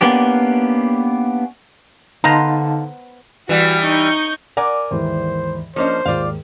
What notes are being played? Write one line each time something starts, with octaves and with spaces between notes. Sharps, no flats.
A#3 B3 C#4 D4 G4
D3 B3 D#4 C5 F5 A5 A#5
E3 G3 F#4
D#4 C#6 G6
A#4 D5 F#5 G#5
D#2 G#2 E3 C5
F3 A#3 C#4 D4 C5 D#5
D#2 G#2 F4 D5 F5